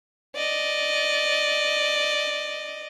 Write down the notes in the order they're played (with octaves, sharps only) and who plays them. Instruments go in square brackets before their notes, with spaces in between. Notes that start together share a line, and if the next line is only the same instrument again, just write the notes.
[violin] D5 D#5